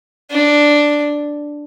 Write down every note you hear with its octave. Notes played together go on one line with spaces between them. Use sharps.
D4